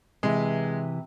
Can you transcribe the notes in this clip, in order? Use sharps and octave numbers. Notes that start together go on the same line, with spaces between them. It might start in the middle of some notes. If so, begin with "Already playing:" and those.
C3 E3 G#3